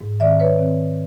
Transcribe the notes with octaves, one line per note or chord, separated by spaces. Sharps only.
G#2
D#3 G#3 C4 D5 E5
G#2 B4 C#5
D#3 G#3 C4
G#2